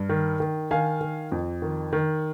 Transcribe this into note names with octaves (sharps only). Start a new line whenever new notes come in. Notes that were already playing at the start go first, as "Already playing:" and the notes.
Already playing: G2
D#3
D#3
D#3 F5 G#5
D#3
F2
D#3
D#3